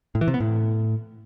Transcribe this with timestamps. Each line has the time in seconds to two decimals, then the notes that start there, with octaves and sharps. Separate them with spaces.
0.15 A2
0.21 E3
0.28 C3
0.34 B3
0.40 A2